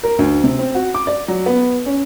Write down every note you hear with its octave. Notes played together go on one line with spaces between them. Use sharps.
A#4
D2
C3
C4
F#4
D6
D5
F#3
B3
C#4